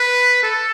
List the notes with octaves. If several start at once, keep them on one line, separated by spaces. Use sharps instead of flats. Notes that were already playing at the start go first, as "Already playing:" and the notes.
Already playing: B4
A4